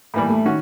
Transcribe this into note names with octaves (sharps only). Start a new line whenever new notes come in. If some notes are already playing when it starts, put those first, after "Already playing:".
A2 E3 G3 A#3
A3
D#3 C#4 F#4